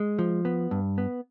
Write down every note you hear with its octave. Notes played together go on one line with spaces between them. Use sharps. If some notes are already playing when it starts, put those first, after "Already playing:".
Already playing: G#3
F3
B3
G2
B3